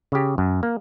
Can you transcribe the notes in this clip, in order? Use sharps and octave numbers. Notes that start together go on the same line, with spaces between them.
C#3 G4
F#2
A#3